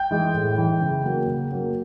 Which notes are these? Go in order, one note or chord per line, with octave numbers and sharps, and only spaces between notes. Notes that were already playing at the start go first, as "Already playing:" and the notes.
Already playing: G5 G6
E3 G#3
A2
E3 G#3
C#3
F#3 A#3
C#3
F#3 A#3